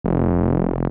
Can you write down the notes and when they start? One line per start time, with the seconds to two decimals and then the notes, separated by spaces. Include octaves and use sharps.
0.04 F1